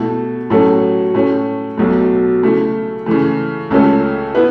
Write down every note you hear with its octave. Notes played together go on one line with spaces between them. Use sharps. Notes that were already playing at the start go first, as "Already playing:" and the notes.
Already playing: B2 A3 E4 A4
A2 F#3 A3 C#4 A4
A2 A3 C#4
B1 B2 F#3 A3
C#3 A3 E4
C#3 E3 A3
C#2 C#3 A3 C#4 A4
B3 E4 B4